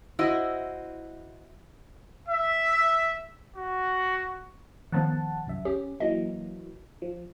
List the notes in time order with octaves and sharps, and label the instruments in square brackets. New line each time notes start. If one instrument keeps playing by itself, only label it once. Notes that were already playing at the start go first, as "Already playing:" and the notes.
[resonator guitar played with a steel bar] E4 F#4 C5 D#5
[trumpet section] E5
F#4
[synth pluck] D#3 F3 B3 [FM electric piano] F#5 A5
[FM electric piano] C2 F#2 E5
[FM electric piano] C#4 [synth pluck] G4
[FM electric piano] E3 F#3 A#3 [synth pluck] D#5
[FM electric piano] F3